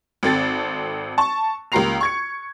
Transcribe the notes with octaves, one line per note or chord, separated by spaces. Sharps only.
G#1 C4 A4 A6
A5 C#6
C#2 A#3 G4 A#5 C7 F7
C#6 G#6 C#7